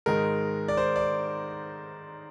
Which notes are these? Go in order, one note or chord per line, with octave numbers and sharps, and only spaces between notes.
G#2 D#3 G#3 A#4
D5
C5
D5